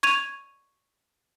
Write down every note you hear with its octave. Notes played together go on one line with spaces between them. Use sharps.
C#6 G#6 D#7 F7